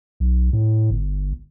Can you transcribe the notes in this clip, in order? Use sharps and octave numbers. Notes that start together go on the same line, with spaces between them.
B1
A2
G1